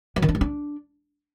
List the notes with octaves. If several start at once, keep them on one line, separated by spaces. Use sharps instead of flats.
F#3
D#3
D4
G3
D4